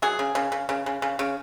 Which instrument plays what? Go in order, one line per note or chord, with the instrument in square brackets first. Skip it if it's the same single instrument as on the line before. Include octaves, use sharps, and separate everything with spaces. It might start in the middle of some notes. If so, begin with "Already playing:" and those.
[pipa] F#3 G#4
C#3
C#3
C#3
C#3
C#3
C#3
C#3